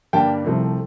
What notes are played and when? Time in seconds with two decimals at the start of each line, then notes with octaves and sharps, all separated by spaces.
0.13 G2 D3 G3 A#3 G5 A5
0.45 C2 C3 F3 A3 C4